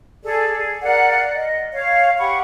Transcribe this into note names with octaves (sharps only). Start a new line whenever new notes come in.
G#4 A4 D5
G#4
A#4 D5 F5 F#5
D#5
C#5 F5
G4 F#5 B5 C#6